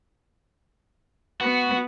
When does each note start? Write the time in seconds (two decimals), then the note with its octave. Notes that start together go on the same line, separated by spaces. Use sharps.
1.41 B3 F#4